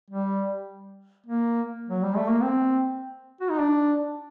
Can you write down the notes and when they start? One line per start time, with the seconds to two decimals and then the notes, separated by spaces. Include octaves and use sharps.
0.10 G3
1.26 A#3
1.89 F#3
2.03 G3
2.16 A3
2.29 A#3
2.43 C4
3.41 F#4
3.50 D#4
3.59 D4